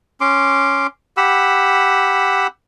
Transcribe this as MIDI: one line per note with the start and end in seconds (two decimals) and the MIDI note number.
0.21 0.87 61
0.21 0.87 84
0.21 0.87 86
1.17 2.47 67
1.17 2.47 78
1.17 2.47 83
1.17 2.47 88